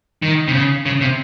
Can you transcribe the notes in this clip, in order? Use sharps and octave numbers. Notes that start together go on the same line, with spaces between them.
D#3
C3
C#3
C#3
C3